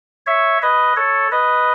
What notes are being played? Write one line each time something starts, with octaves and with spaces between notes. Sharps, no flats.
C#5 E5
B4 D#5
A4 C#5
B4 D#5